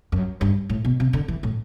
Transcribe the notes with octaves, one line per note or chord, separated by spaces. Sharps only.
F#2
G2
A2
B2
C3
D3
E3
A2